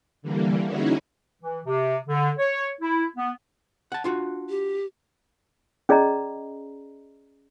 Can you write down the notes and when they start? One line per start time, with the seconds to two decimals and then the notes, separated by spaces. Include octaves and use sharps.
0.22 D3 E3 G3 A#3
0.65 C#4 D#4 E4 F#4 G#4
1.42 E3
1.66 C3
2.08 D3
2.38 C#5
2.81 E4
3.17 B3
3.92 F#5 A5
4.04 D4 F4 F#4
4.49 G4
5.89 C#4 G#4 D5 D#5 A#5